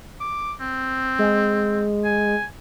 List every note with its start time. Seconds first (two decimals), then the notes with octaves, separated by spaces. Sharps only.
0.20 D6
0.61 C4
1.19 G#3
2.04 G#5